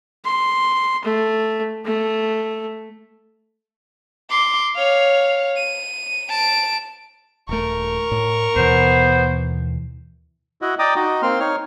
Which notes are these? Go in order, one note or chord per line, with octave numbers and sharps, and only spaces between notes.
C6
A3
A3
C6 D6
C#5 F5
D#7
A5 D7
D#1 A3 A#4 C#6
A2
D#2 B2 E3 B3 C5
E4 F#4 D#5 F#5
D5 D#5 G5 A#5 D6 D#6
D#4 F#4 D#5
A#3 C4 C6 F6
D#4 C#5 F6